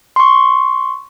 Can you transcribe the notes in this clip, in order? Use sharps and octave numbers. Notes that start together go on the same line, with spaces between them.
C6 C#6